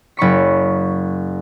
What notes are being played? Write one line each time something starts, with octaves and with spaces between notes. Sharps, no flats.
F#1 B5 C#6 B6